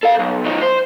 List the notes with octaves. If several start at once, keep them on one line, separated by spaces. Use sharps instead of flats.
A4 F5
B1
D#3 F#3
C5